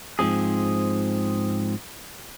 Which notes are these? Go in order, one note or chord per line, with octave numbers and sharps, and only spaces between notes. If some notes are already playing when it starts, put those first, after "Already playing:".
G#2 F3 C4 G#4